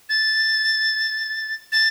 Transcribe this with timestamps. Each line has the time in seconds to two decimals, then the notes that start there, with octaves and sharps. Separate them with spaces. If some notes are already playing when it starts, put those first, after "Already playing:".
0.09 A6
1.72 A6